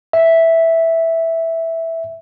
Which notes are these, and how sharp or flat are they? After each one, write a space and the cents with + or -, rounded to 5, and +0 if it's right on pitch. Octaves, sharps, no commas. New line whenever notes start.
E5 -5